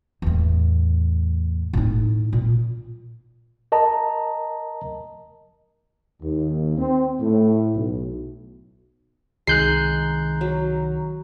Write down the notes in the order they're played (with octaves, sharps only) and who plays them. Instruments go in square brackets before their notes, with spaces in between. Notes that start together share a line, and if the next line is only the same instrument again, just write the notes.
[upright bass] E2 A2
A2 D#4
A#2
[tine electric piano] A#4 D#5 A5 A#5
[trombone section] D#2
C4
A2
B1
[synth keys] C2 D#3 A#5 [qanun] G#3 [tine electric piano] F#6 G6 C7
[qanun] F#3